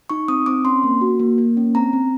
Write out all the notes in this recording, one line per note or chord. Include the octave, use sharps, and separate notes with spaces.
D#4 C#6
C4 D#6
C4 D6
C#4 C6
A#3
F#4
A#3
A#3
C#4
C4 A#5
C4